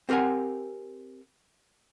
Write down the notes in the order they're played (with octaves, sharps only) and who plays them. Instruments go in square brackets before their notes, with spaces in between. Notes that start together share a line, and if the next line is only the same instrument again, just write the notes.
[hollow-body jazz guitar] C4 G4 A#4 F#5 G#5